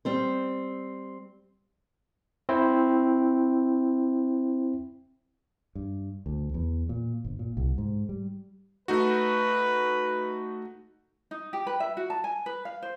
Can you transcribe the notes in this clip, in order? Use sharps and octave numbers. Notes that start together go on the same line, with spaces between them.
G3 C4 C5
C4 E4 C5
G2
D2
E2
A#2
G1
A#2
C2
G#2
G3
A3 D#4 F#4 B4
D#4
G4
B4
E5
F#4
A5
G#5
B4
F5
C5